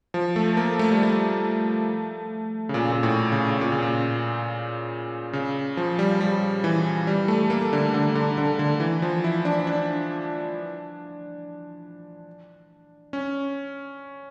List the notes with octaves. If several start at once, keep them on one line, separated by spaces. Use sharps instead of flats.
F3
A3
A#3
A3
G3
A3
C#3
A#2
A#2
A2
C#3
A#2
C#3
A#2
C#3
F3
G3
G3
E3
G3
A3
A#3
D3
D3
D3
D3
D3
E3
F3
E4
D4
D4
C#4